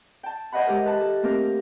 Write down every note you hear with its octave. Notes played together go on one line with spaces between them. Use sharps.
G5 A5
C5 C#5 D#5 E5 F#5 B5
G#3 G4 A#4
B4 A5
A4
A3 A#3 C4 G4 A#4 F5